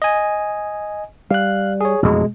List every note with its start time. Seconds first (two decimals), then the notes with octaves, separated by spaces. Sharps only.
0.02 D#5 G#5
1.31 G3 F5 F#6
1.81 G#4 C#5
2.03 A1 F2 B2 G#3